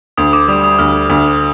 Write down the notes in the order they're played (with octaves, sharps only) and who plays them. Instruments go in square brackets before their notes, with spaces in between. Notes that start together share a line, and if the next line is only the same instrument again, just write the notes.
[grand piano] D2 [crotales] D#6
[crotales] D6
[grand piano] G3 [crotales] D#6
[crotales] D#6
[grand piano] D2 [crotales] F6
[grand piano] D2 [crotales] D#6